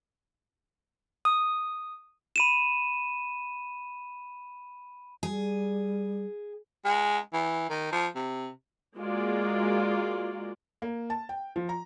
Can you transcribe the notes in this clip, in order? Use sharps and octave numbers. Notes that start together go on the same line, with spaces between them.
D#6
B5 D#7 E7
G3 G#4
G#3
E3
D#3
F3
C3
G#3 A#3 F4 F#4 A#4 D5
A#3
A5
G5
F3
A#5